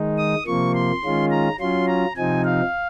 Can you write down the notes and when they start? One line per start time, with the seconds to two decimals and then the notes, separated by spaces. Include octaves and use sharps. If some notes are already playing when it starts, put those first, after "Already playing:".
Already playing: D#3 G#3 D#4
0.18 D#6
0.46 C3 F3 A#3 C#6
0.75 C6
1.04 D#3 G#3 C#4 F4
1.31 A#5
1.60 F#3 C#4 F4 C6
1.88 A#5
2.16 C3 F3 C4 D#4 G#5
2.45 F5